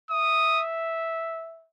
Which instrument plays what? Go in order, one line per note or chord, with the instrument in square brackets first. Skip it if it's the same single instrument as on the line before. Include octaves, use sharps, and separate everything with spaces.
[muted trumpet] E5 [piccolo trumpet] D#6